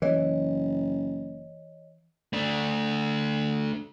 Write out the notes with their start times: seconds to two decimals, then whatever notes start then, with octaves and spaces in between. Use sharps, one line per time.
0.02 F#1 E3 C#5 D#5 E5
2.33 A3 D4